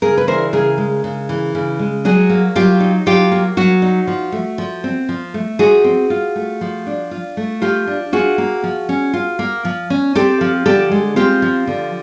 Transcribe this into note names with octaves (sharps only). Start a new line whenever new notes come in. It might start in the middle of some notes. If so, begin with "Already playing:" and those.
C#3 G#4 A#4
B4
E3 A#4 C5
C#3 G#4 A#4
G#3
C#3
E3
C#3
G#3
F#3 F#4 G#4
A#3
F#3 F4 G4
D#4
F#3 F4 G4
A#3
F#3 F#4
D#4
F3
A3
F3
C4
F3
A3
F3 F#4 G#4
C4
F4
A3
F3
D4
F4
A3
F3 F4 G4
D4
F4 F#4 G#4
A#3
F3
C#4
F4
A#3
F3
C#4
C4 G4 A4
F3
D3 G4 A4
G#3
C4 F4 G4
F3
D3